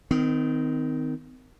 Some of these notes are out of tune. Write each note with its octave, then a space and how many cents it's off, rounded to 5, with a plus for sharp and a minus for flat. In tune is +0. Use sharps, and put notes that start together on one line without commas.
D#3 +0 C4 -40